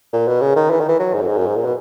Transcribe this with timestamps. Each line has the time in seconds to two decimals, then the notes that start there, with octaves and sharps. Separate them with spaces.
0.13 A#2
0.28 B2
0.41 C#3
0.56 D#3
0.70 E3
0.80 D#3
0.89 E3
0.99 F#3
1.14 G#2
1.21 F#2
1.27 G#2
1.37 F#2
1.46 G#2
1.56 A#2
1.65 B2